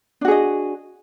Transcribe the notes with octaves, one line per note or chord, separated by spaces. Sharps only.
D4 F#4 G#4 D#5